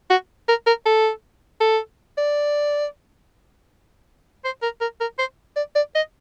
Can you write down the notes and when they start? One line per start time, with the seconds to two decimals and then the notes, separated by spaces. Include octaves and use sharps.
0.10 F#4
0.48 A#4
0.67 A#4
0.86 A4
1.61 A4
2.18 D5
4.44 C5
4.62 A#4
4.81 A#4
5.01 A#4
5.19 C5
5.56 D5
5.75 D5
5.95 D#5